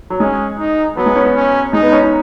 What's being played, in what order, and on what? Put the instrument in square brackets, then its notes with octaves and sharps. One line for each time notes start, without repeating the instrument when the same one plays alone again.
[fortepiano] F#3
[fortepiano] G#3 [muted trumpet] C#4
[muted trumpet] D#4
[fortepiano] F#3 [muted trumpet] B3
[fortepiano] G#3
C#4
B3
[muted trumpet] C#4
[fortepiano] G#3 [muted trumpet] D#4
[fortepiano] B3
C#4
D#4